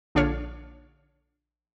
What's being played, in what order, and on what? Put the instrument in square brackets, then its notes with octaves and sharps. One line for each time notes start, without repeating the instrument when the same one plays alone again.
[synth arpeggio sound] A#1 D3 D4 F4 C#5 F6